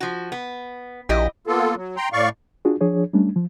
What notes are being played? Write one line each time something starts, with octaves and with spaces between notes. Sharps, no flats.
F3 F#4
B3
A#1 E4 G4 D#5
A#3 B3 F4 A4
F#3
G5 A#5 C6
A2 D5 F5 C#6
D4 F4 F#4 G#4
F3 D4 G#4 C#5
G3 A3 C#4 D4
F3